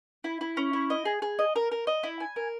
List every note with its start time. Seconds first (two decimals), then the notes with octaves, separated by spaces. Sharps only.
0.24 E4
0.41 E4
0.57 C#4
0.73 E4
0.90 D#5
1.05 G#4
1.22 G#4
1.39 D#5
1.56 A#4
1.72 A#4
1.87 D#5
2.03 E4
2.20 G#5
2.36 A#4